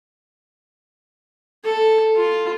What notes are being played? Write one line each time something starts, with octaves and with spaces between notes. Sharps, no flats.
A4
F4